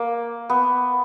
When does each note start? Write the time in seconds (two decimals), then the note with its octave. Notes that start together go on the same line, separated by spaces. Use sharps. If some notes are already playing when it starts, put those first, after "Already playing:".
Already playing: A#3
0.49 B3